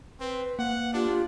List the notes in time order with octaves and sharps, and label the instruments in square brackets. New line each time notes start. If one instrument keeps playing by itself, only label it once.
[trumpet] C4 [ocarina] B4
[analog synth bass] A#3 [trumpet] F#5
[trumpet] D4 [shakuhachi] F4 [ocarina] G4